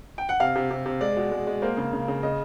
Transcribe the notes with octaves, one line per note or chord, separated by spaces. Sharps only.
G5
F#5
C3 F5
C3
C3
C3
G#3 D5
B2
G#3
G#3
A#3 C5
C#3
C#3
C#3
C#3 D#5